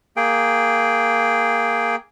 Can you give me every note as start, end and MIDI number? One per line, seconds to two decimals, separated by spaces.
0.17 1.96 58
0.17 1.96 68
0.17 1.96 79